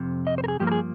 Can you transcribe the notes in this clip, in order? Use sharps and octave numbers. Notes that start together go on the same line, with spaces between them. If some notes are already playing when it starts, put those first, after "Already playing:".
Already playing: F2 C3
D#5
C5
A#4
G#4
G2 F3 A#3 G4
A#4
G#4